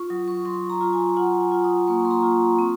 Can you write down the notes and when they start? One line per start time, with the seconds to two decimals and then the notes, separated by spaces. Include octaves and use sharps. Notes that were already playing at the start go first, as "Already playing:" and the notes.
Already playing: F4 C#6
0.10 F#3 D#6
0.28 C#6
0.45 F#3 C6
0.70 A#5
0.81 F4
0.93 G#5
1.17 F4 F#5
1.41 G#5
1.52 F4
1.64 D#6
1.87 A#3 C#6
2.05 C6
2.11 A#5
2.23 F4
2.59 C4